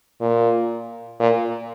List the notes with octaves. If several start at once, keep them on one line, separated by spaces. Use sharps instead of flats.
A#2
A#2